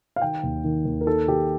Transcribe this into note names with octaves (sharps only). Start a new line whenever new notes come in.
F5
D#3 G5
D#2
D#3
D#2
A#4
D#4 A4
D#3 G4